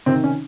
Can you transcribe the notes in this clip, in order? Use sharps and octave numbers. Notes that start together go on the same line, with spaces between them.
C3 D#3 C4
C#4